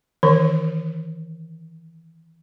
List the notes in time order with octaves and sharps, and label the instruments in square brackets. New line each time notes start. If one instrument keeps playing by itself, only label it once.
[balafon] D#3 E3 A#4